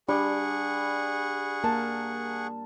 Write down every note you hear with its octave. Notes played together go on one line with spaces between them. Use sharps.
G3 D4 G#4 F#5 C#6
A#3 A#4 A5